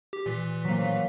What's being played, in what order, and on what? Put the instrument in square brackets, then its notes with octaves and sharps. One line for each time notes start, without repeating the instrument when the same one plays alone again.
[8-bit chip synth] G4
A#2 E3 B6
[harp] F#3 A#3